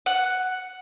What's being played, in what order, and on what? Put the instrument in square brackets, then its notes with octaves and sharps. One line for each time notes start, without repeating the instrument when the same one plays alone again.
[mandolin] F#5